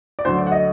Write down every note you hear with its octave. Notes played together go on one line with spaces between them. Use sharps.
D5
D2 D3 F#3 C5
D5
F#5
D#5